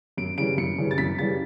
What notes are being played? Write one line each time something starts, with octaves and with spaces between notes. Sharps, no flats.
F#2 D7
C#3 E3 G3 D7
F#2 C#7
C#3 E3 G3
A6
F#2 B6
C#3 E3 G3 A6